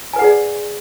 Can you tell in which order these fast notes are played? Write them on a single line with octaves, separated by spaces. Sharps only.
G#5 B4 F#5 G#4 D5